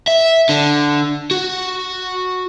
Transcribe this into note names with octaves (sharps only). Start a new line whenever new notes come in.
E5
D3
F#4